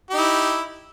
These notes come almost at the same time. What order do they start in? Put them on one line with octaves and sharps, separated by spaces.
G4 D#4 E4